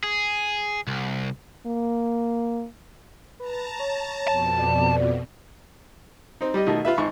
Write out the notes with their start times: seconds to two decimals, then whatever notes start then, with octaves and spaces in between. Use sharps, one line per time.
0.04 G#4
0.87 C2
1.66 A#3
3.40 B4 A5 A#5
3.79 C#5
4.28 F2 B2 A5
4.59 D5
6.41 C4 D#4
6.54 G3 G4 D#5
6.66 B2 D#3 A3 D#5
6.85 F4 B4 E5
6.98 G#1 G#2 C#6